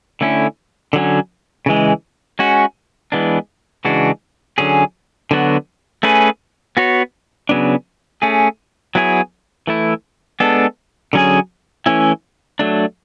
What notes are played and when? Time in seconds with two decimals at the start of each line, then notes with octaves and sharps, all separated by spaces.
0.21 D3 A3 C#4 E4
0.93 D3 F#3 C#4
1.66 C#3 E3 G#3
2.39 G#3 C#4 F#4
3.12 E3 G#3 B3 D4
3.85 C#3 E3 G#3 D4 F#4
4.58 D3 F#3 C#4 G#4
5.31 D3 F#3 B3 F#4
6.03 A3 C#4 G#4 B4
6.77 B3 F#4 C#5
7.49 C#3 F#3 B3 D4
8.22 A3 C#4 G#4
8.95 F#3 B3 E4 G#4 C#5
9.67 E3 A3 E4
10.40 G#3 B3 D4 A4
11.13 D3 F#3 C#4 G#4
11.86 E3 A3 C#4 E4
12.59 F#3 A3 D4